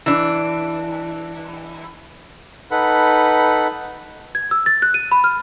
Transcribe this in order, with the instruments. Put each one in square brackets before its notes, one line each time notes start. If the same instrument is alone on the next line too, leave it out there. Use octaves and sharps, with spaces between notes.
[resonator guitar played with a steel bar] E3 D4
[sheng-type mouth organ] D#4 A4 B4 F#5 B5
[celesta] G#6
E6
A6
F#6
D#7
B5
F6